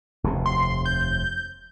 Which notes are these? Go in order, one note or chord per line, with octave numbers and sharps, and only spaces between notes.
F1 D#2 C3
C6
G6